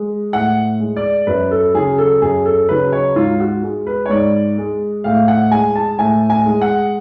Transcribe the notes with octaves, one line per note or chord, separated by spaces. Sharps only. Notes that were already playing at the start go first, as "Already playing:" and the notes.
Already playing: G#3
A2 F#5
G#3
D5
F#2 B4
A4
C#3 F#3 G#4
A4
F#2 G#4
A4
C#3 F#3 B4
C#5
G#2 F4
F#4
G#3
B4
C#5
G#2 D5
G#3
A2 F5
F#5
G#3 G#5
A5
A2 G#5
G#5
G#3
F#5